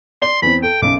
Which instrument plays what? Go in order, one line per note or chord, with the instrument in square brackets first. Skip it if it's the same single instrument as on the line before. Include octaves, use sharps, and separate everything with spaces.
[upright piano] D5 G7 [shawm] C6
[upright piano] E2 C4 [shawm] B5
[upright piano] A4 [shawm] G5
[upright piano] B1 F#2 C#3 [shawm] D6